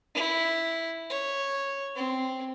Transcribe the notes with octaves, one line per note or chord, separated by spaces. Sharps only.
E4
C#5
C4